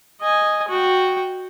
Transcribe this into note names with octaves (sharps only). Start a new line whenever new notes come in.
D#5 G#5
F#4 G5